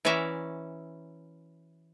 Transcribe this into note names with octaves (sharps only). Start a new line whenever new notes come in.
E3 C#4 F#4 D5 E5 A#5